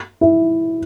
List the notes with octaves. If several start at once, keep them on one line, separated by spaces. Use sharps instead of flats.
E4